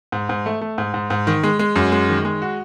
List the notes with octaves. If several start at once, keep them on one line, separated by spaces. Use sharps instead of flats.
G#2
G#2
A3
A3
G#2
G#2
G#2
D#3
G#3
G#3
F#2
G#3
D#3
G#3
F#4